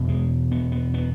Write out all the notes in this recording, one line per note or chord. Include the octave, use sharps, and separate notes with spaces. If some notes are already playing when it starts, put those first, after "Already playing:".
Already playing: E2 B2
G#3
B3
B3
B3